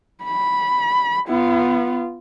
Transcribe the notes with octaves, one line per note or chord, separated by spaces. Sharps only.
B5
B3 F4